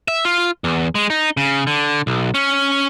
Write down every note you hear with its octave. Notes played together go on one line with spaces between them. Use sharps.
E5
F4
E2
G#3
D#4
C#3
D3
B1
C#4